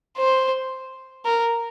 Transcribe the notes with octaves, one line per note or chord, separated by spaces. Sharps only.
C5
A#4